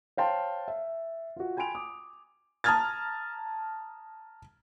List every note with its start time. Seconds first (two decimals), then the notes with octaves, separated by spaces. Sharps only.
0.17 C5 C#5 F5 G5 A5 C6
0.68 E5
1.36 F4 F#4
1.57 G5 G#5 B5 C6 D7 F7
1.75 D6 D#6
2.64 A5 A#5 D#6 F6 G#6 A6